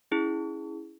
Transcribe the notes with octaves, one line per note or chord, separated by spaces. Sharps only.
C#4 E4 G#4